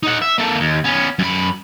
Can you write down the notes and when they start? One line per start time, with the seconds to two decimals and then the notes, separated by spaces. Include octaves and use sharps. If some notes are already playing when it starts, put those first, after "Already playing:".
0.03 D#4 F#5
0.22 E5
0.38 A#3 A4
0.60 D#2
0.84 B3 C#4
1.19 F#2 B5